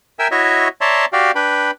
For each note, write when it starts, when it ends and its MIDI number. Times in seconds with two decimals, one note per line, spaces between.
0.19 0.28 70
0.19 0.28 76
0.19 0.28 79
0.19 0.28 80
0.19 0.28 88
0.31 0.68 64
0.31 0.68 66
0.31 0.68 73
0.31 0.68 75
0.31 0.68 76
0.81 1.05 73
0.81 1.05 74
0.81 1.05 76
0.81 1.05 81
0.81 1.05 82
0.81 1.05 84
1.13 1.31 66
1.13 1.31 67
1.13 1.31 74
1.13 1.31 77
1.13 1.31 79
1.35 1.71 62
1.35 1.71 71
1.35 1.71 79
1.35 1.71 83